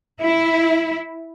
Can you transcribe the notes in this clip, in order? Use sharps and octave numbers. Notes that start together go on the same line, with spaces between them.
E4